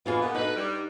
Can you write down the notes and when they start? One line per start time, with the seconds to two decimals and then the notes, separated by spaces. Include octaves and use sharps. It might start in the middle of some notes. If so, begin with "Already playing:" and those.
0.06 E3 G#3 B3 F4 G#4
0.22 A#2 B3 F#5
0.35 F#3 D#4 A4 B4
0.55 G2 G3